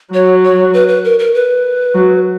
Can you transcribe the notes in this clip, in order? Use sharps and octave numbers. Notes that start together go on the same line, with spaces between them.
F#3 C#5
C#5
B4
B4
A#4
A#4
B4
F#3